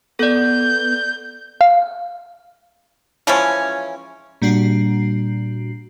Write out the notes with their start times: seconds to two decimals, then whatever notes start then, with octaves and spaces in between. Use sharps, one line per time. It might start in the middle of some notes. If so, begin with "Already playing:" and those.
0.19 B3 A4 D5 G6
1.61 F5
3.27 E3 F3 G#3 C#4
4.42 A#2 G3 D4 F#4 C7